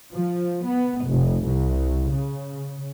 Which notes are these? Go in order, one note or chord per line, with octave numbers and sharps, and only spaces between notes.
F3
B3
F1
C2
C#3